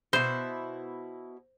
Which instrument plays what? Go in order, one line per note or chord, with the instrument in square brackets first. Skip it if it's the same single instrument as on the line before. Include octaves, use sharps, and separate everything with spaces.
[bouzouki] B2 E4 [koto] C5